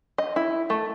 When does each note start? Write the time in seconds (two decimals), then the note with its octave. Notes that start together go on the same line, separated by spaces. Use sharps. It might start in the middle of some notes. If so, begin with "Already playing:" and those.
0.18 D#5
0.36 E4
0.70 A3